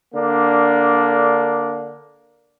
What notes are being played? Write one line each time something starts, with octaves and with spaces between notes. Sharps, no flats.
D3 A#3 D4